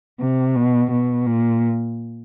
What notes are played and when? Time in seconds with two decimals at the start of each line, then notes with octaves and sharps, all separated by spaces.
0.20 C3
0.56 B2
0.91 B2
1.26 A#2